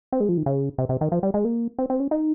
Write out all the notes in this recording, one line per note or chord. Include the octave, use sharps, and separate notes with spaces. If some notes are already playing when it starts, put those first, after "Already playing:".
C4
G#3
F3
D#3
C#3
C3
C3
D#3
F3
G3
G#3
A#3
C4
C4
C#4
D#4